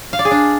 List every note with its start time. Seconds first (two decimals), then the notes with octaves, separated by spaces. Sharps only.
0.13 F5
0.19 D5
0.25 G#4
0.31 D4